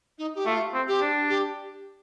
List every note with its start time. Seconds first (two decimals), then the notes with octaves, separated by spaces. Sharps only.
0.18 D#4
0.35 G4
0.46 A3 F4
0.74 C4
0.87 G4
1.01 D4
1.28 G4